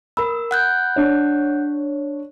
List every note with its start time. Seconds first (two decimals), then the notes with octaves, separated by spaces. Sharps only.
0.17 A#4 B5 E6
0.51 F#5 F#6 G6
0.96 D4 C#5